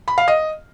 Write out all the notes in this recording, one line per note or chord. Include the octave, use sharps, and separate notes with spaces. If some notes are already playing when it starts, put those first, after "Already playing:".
B5
F5
D#5